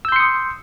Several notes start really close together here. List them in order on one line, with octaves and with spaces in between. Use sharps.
E6 G6 C6 C#7 D#6